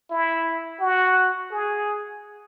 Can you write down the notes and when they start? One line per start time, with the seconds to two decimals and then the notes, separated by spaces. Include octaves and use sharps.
0.10 E4
0.80 F#4
1.51 G#4